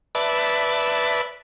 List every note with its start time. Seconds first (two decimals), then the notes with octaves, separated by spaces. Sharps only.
0.15 B4 D5 E5 A5